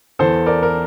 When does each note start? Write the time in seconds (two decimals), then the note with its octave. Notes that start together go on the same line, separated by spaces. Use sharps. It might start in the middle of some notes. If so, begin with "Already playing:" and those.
0.19 E2 E3 A4 C5
0.46 A#4 D5
0.63 A#4